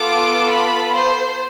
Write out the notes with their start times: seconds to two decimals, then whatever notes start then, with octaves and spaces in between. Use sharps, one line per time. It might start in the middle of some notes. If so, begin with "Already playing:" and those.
Already playing: B3 F4 A4 D6
0.51 B5
0.93 C5